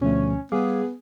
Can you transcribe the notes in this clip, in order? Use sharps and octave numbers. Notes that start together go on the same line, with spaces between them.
D2 B2 F3 A3 C#4
G3 B3 G#4 F5 D6